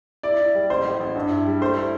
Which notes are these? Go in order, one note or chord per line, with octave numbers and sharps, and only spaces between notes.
E4 D5
E4
G3
A1 C5
A2
A1
G2
E4
G3
A3 C5
E4